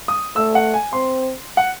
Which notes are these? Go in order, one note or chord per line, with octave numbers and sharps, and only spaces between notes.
D#6
A3 E6
F#5
G#5
C4 C6
F#5